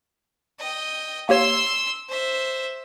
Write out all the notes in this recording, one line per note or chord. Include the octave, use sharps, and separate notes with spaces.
D#5 G5
A#3 G4 C#5 C6 E6
C5 E5